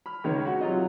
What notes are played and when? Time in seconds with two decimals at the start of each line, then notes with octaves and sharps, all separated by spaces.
0.06 B5 F6
0.24 C#2 D#3 B4 C#5
0.47 F#4
0.61 C3 F#3 F4 D#5